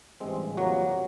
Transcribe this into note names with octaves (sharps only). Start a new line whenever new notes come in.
A1 G2 E3 G#3 C4
F2 C3 E3 F#3 G3 A#3 F#4